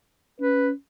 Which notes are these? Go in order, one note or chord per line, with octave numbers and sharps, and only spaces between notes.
C#4 B4